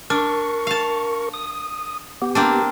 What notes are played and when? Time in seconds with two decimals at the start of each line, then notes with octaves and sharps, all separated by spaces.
0.10 D4 A#4 C#6
0.67 F5 A5
1.34 D#6
2.22 B3 G4
2.35 A#3 C4 D4